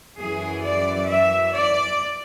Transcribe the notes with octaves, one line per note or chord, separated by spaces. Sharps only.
F#2 E3 G#4
D5
E5
D5